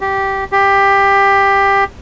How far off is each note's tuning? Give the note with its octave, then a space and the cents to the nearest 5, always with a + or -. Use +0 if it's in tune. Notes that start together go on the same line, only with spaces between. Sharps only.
G4 -10
G4 +15